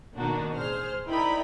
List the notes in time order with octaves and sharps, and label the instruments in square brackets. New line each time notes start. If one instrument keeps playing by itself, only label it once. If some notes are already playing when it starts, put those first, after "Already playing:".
[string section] B2 D#3 A#3 D4 D#4 F#4
A1 G#4 C5 F6
D#4 E4 A#4 D5 G5 B5